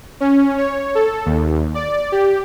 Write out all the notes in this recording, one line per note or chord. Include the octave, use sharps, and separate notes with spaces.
C#4
C#5
A4
D#2
D5
G4